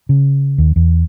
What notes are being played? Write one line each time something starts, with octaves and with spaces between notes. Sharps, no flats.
C#3
D#2
E2